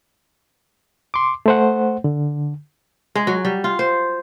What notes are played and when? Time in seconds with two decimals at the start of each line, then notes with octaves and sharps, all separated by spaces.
1.14 C6 D6
1.46 A3 C5 F#5
2.04 D3
3.15 G#3
3.27 F#3
3.45 G3
3.64 F4
3.79 C5